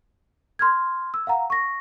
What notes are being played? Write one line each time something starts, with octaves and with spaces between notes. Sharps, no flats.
C6 F6 G#6
E6
F5 F#5 A#5
C#6 A#6